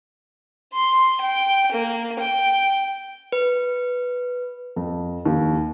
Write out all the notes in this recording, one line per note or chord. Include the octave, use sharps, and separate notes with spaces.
C6
G5
A#3
G5
B4
F2
D#2